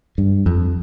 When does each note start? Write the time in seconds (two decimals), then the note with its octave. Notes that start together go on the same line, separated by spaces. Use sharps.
0.18 G2
0.46 F2